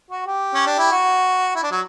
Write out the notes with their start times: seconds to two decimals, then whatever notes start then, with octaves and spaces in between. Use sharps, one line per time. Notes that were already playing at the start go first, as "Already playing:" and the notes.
0.11 F#4
0.26 G4
0.54 C#4
0.66 D4
0.79 E4
0.92 F#4
1.55 E4
1.63 D4
1.71 F#3